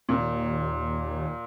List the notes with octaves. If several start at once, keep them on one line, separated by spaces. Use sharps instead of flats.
D#2 A#2